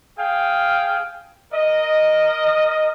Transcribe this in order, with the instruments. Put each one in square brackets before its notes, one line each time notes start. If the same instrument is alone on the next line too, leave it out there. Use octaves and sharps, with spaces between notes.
[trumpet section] G#4 F5 G5
A#4 D#5